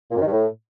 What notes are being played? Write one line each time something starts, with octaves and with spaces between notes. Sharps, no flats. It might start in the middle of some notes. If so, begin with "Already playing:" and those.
A#2
F#2
D#3
G2
A2